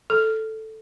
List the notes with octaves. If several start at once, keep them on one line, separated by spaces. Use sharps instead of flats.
A4